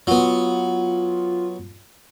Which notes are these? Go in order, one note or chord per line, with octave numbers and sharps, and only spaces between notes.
F#3 B3 F4